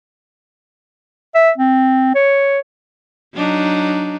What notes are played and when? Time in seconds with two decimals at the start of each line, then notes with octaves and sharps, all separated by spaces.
1.35 E5
1.58 C4
2.15 C#5
3.35 F#3 D4 D#4